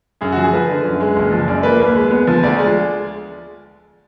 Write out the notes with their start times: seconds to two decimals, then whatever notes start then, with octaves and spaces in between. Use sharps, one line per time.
0.21 F#2 G#4
0.32 F#4
0.37 F3
0.43 G#4
0.53 F3 B4
0.69 D3
0.85 F#2
1.00 G#3
1.16 F#1
1.32 F3
1.47 F#2 D5
1.63 A#3 B4
1.80 D#2 B4
1.95 G#3
2.11 B3
2.27 F3
2.43 D2 D5
2.58 G#3